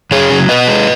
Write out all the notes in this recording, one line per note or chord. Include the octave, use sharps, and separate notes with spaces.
F#2 G#4 C#5
C#3 F#3
B2 B4 D#5
G#3